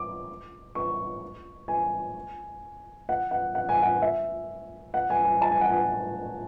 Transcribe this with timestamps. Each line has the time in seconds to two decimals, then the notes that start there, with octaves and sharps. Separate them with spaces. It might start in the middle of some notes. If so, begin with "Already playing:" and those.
Already playing: D6
0.75 C#6
1.68 G#5
3.09 F#5
3.31 F#5
3.55 F#5
3.69 G#5
3.82 F#5
4.02 E5
4.94 F#5
5.10 G#5
5.25 G#5
5.42 A5
5.51 G#5
5.61 F#5
5.70 G#5